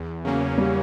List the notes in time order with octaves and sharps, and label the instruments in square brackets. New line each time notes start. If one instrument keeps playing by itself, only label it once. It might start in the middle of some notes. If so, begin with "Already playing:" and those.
Already playing: [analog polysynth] E2
C#3 F#3 A#3 C#4
[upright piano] G3